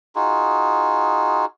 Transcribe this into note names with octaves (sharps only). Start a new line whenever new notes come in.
D#4 F4 F#4 G#4